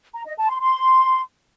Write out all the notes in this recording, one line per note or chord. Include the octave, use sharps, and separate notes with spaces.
A#5
D#5
A5
C6
C6